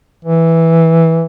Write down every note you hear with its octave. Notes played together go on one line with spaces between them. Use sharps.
E3